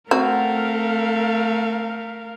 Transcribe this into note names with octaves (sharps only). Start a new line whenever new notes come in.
A3 C4 F#4 A#4 F5